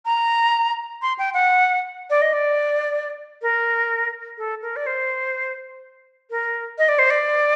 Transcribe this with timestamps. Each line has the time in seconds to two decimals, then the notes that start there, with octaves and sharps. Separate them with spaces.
0.06 A#5
1.02 C6
1.19 G5
1.34 F#5
2.10 D5
2.22 D#5
2.33 D5
3.42 A#4
4.38 A4
4.62 A#4
4.76 D5
4.86 C5
6.30 A#4
6.78 D#5
6.89 D5
6.99 C5
7.10 D5